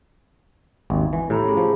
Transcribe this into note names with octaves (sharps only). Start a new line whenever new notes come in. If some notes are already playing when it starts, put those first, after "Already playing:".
G#1 D#2
E3
A2 G4 A#5 B5
C#4 G#4
F3